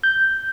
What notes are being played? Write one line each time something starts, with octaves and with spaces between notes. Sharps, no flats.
G6